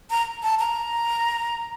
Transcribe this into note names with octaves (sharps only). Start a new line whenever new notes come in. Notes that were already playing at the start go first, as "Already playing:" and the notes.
A#5
A5
A#5